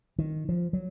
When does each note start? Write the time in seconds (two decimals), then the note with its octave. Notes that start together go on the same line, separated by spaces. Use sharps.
0.19 D#3
0.49 F3
0.73 F#3